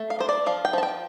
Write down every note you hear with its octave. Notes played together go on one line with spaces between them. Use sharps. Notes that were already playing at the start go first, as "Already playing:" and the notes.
Already playing: A3
F5
D4 C5
D5
F3 F5
G5
F3 A5
G5